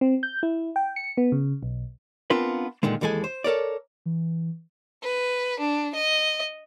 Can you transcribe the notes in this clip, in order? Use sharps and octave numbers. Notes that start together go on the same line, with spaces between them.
C4
G6
E4
G5
C#7
B3
C#3
B1
B3 C4 D4 F4 A#4 B4
A#2 D3 D#3 G#3
D#2 E3 G#3 A4 G#5
C5
A4 A#4 C#5 D5
E3
B4
D4
D#5